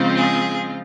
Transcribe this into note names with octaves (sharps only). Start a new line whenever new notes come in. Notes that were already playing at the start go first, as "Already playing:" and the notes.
Already playing: C#3 F3 G#3 C4 F4
G#4